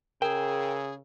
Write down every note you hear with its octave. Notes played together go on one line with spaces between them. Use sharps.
C#3 G#4 A#4 G5